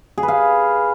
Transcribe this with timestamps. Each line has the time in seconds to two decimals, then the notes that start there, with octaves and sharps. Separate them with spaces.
0.18 G#4
0.23 B4
0.28 F5